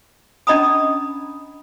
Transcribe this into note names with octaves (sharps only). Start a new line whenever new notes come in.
C#4 D4 D#5 A#5 B5 D#6